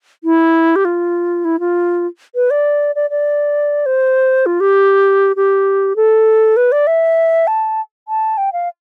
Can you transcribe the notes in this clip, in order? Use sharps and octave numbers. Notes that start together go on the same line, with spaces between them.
E4
G4
F4
E4
F4
B4
D5
D5
D5
C5
F4
G4
G4
A4
B4
D5
E5
A5
A5
G5
F5